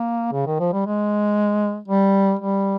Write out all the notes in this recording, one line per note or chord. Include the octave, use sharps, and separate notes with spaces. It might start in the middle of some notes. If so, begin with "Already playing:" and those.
Already playing: A#3
C#3
D#3
F3
G3
G#3
G3
G3